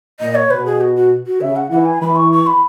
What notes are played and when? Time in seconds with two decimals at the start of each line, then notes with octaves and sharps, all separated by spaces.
0.20 A#2 D#5
0.35 C#5
0.50 B2 B4
0.66 G#4
0.81 F#4
0.96 F#4
1.27 F#4
1.41 C#3 E5
1.56 F#5
1.71 E3 F#5
1.86 G#5
2.01 E3 B5
2.16 C#6
2.32 C#6
2.47 B5